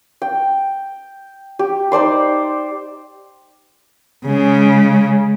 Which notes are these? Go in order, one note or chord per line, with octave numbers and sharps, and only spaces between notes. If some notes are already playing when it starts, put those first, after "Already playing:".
G5
G4
D#4 C5 D5 C6
C#3 G#3